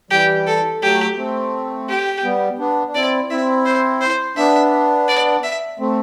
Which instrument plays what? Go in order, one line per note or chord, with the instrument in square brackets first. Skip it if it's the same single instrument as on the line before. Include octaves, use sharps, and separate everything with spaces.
[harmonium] E3 G3 [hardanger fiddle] G4
[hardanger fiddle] A4
[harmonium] F#3 A3 [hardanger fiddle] G4
[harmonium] A3 C4
[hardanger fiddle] G4
[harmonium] G3 B3
B3 D4
D4
[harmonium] C4 E4 [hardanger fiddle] D5
[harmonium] C4 E4 [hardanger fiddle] E5
[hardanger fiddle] C5
C5
[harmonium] B3 D4 [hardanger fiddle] E5
[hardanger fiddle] D5
E5
[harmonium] A3 C4